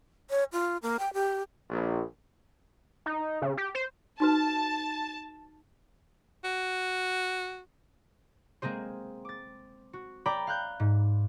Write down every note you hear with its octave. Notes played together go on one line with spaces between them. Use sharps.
C#5
F4
A#3
G5
G4
A#1
D#4
C#3
G4
C5
D#4 F#4 B4 A5
F#4
G#3 A#3 C4 G#4 C5
D6 A6
F#4
D5 G5 A#5 B5 D6
F5 F#6 G6
G#2